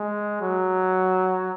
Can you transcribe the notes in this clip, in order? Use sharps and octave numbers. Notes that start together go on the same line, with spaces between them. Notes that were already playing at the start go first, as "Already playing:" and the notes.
Already playing: G#3
F#3